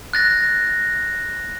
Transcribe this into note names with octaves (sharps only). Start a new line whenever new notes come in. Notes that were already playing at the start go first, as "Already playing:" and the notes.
F#6 A6 A#6